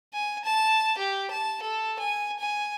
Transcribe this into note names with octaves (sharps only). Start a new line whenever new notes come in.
G#5
A5
G4
A5
A4
G#5
G#5